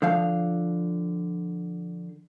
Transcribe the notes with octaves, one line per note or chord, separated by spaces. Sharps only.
D3 F3 F5